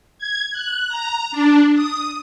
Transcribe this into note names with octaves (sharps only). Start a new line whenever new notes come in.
G#6
F#6
A#5
D4
D#6